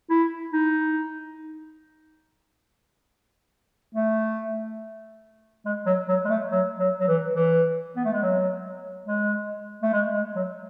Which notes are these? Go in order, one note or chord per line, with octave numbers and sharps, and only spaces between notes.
E4
D#4
A3
G#3
F#3
F#3
G#3
A3
F#3
F#3
F#3
E3
E3
B3
A3
G#3
F#3
G#3
A3
G#3
G#3
F#3